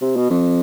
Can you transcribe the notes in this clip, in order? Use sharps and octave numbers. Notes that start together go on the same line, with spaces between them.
C3
B2
F2